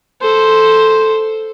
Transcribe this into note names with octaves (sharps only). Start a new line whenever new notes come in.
A4 C5